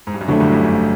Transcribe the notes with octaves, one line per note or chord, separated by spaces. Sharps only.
G#2
G2
F#2
F2 D3 F#3 A3
G1 G2
F#2
F#2